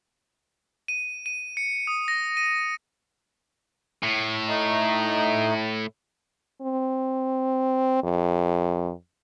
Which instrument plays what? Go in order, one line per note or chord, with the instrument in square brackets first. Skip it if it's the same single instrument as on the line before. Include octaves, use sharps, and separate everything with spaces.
[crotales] D#7
D#7
C#7
D#6
A#6
D#7
[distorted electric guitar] A2
[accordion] A3 D#4
[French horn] C4
F2